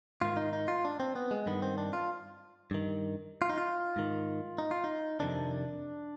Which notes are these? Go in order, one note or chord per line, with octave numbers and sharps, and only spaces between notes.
G#2 D#3 F4
D#4
D#4
F4
D4
C4
B3
G#3
G2 D#3 B3
C4
D4
F4
G2 D#3
F4
D#4
F4
G#2 D#3
D#4
F4
D#4
F2 C3 D#3 D4